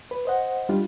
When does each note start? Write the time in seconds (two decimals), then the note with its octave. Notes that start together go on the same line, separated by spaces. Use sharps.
0.11 B4
0.25 C5 D#5 F#5
0.69 G3 D4 F4